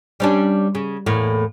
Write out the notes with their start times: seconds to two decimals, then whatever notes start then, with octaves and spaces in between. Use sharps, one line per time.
0.20 G3 C#4 D4
0.75 C#3
1.06 E2 A2 A#3